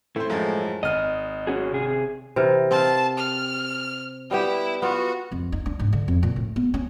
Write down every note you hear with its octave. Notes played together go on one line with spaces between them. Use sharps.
A2 A3 C4 C5
F#2 F3 G#3
G#1 D#5 F6
C#4 F#4 G#4
C3 G#4
C3 E3 A#4
C4 F5 A5
F6
G3 B3 E4 G4
B3 F4 F#4
F2
D#4
D4
G#2
D3
F2
A#2
A2
B3
C#4